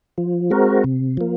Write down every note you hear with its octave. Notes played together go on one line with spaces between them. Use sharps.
F3
G#3 C4 F#4 A#4
C3
F3 A#3